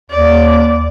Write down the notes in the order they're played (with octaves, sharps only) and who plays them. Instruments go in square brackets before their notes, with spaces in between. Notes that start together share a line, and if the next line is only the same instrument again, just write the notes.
[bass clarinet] D#2 [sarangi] D5